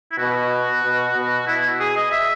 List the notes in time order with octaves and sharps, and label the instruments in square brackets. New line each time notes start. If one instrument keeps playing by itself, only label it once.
[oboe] E4
[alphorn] B2 [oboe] F#4
[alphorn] B2
B2
[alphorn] B2 [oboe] E4
[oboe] G#4
D#5
E5